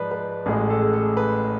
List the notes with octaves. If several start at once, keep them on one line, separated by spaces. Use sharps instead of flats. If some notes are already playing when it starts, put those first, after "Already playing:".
Already playing: G#2 F3 G#3 B4 D5
B4
A1 A2 G#3 G#4
A4
G#4
A4
B4